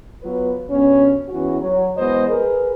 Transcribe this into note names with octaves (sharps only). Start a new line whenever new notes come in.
F#3 B3 F4 B4
G2 B2 B3 C#4
E2 E3 C#4 F#4
F#3
E3 G#3 B3 C5 D#5
G#4 A#4 B4